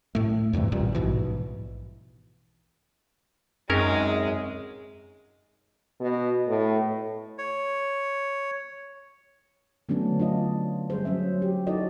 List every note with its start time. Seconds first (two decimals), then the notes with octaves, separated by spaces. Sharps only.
0.15 A2 A3
0.53 E2 G2 C3 E3
0.72 A1 D#2 A#2 G3
0.95 A#1 G#2 B2 E3
3.70 F#2 G#3 C4 C#4 D#4 G#4 A#4
6.00 B2
6.48 A2
7.38 C#5
9.89 D3 F#3 A3 B3 C#4 D4
10.20 D4 F4 D#5
10.90 G3 G#4 C5
11.05 F#3 C#4 E5
11.42 G4
11.67 D#4 E4 F#4 A4 D5 D#5